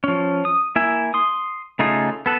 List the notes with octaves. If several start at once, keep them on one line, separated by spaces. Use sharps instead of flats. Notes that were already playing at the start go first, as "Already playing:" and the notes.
F3 C#4
D#6
A#3 E4 E5 G#5
C6 D#6
C#3 A3 D#4 F4 G#4
B3 A4 B4